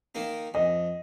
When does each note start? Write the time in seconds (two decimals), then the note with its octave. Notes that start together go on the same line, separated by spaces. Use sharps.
0.15 D#3 A#3 D#4
0.54 F2 D#5